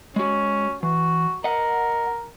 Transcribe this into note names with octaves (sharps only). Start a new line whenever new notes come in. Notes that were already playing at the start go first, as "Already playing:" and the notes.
G#3 C#4 F#4
E3 F#4
A#4 D#5 F#5